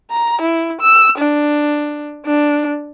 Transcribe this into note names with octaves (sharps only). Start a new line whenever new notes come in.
A#5
E4
E6
D4
D4